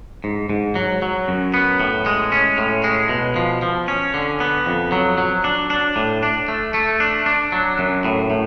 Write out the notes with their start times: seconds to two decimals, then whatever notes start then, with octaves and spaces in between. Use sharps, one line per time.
0.24 G#2
0.50 G#2
0.75 F#3
1.02 F#3
1.28 F#2
1.54 B3
1.80 A2
2.06 G#3
2.32 C#4
2.58 A2
2.84 G#3
3.09 B2
3.36 F3
3.62 F3
3.88 C#4
4.14 D3
4.40 B3
4.66 F2
4.92 F#3
5.18 F#3
5.44 D4
5.70 D4
5.96 A2
6.23 D4
6.48 A3
6.74 A3
7.00 D4
7.26 D4
7.52 F#3
7.79 F#2
8.05 A2
8.31 A2